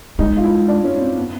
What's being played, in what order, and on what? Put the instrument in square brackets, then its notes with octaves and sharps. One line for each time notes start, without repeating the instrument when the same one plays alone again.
[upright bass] G#3 [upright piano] D#4
[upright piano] F4
E4
D4
C#4
C4
B3